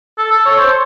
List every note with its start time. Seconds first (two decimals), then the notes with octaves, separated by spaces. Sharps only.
0.18 A4
0.31 A4
0.46 C#5
0.59 C5